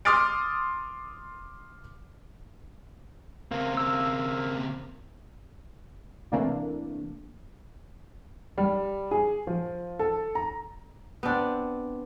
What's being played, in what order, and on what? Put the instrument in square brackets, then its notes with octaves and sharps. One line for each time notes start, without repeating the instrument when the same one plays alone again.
[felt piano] C6 D6 D#6 F6 A6 D7
[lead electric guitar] C#3 C4 [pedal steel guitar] A#3
[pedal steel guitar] A#3 E6
[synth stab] C3 E3 A3 A#3 D4
[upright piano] G3
G#4
F3
A4
A#5
[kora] B3 C4 D4